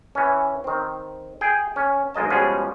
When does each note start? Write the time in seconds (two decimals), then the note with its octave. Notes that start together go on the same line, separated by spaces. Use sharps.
0.15 E3 C#4
0.64 D#3 C4
1.41 G#4 G5
1.76 C#4
2.15 B1 G#3 A#3 D#5 A5
2.30 B2 F3 G3 G#3 C#4 G#4